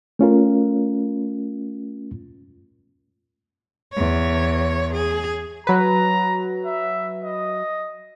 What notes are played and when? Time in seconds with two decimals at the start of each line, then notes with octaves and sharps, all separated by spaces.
0.19 A3 C#4 F4 A#4
3.93 E2 C#5
4.94 G#4
5.67 F#3 B4 A#5
6.66 E5
7.25 D#5